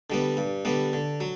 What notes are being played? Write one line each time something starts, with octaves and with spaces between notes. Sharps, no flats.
D3 G3 B3
G2
D3 G3 B3
D3
F#3